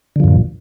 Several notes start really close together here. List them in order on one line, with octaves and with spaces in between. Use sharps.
D3 F3 F#2 A#2